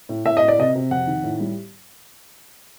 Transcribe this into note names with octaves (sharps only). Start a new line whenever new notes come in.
A2
A2 E5
D#5
A2
D5
C3 D#5
C3
F2 F#5
D#3
A2
G3